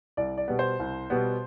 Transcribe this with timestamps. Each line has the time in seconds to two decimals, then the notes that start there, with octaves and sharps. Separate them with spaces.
0.17 C2 D5
0.37 D5
0.48 B2 G3 B3
0.59 C5
0.80 C2
1.10 B2 G3 B3